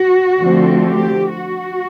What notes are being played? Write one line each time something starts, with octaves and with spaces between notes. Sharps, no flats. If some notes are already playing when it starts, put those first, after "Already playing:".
Already playing: F#4
D3 F3 A3 C4
G4
F#4